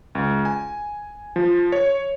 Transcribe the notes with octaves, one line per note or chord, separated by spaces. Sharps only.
C#2
G#5
F3
C#5